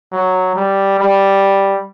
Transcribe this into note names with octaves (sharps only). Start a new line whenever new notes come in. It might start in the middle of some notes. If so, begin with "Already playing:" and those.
F#3
G3
G3